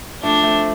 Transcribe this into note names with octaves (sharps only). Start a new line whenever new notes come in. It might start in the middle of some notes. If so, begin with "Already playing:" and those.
F3 A3 D4
A3 C4